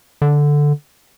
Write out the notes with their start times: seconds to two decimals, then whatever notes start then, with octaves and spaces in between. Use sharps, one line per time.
0.22 D3